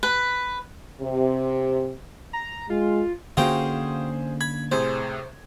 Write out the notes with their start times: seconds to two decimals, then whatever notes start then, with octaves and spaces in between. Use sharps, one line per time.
0.03 B4
1.01 C3
2.33 A#5
2.70 G#3 F4
3.37 D3 A#3 C#4 F4 F#4 G#4 C5 G5
4.41 B5 G#6
4.72 A2 C3 G#4 C5